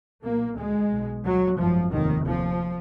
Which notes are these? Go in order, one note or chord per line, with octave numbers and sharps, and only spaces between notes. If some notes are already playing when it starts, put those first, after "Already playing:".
B1 A#2 A#3
D2 G#3
B1 B2
D2 F#3
G#1 F#2 F3
F1 D#2 D#3
F1 D#2 F3